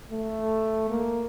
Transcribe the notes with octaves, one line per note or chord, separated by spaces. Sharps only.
A3
A#3